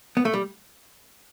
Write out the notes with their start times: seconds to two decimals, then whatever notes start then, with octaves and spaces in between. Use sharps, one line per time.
0.17 B3
0.25 A3
0.34 G3